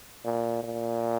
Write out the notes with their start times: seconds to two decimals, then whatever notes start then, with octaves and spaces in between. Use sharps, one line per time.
0.25 A#2
0.63 A#2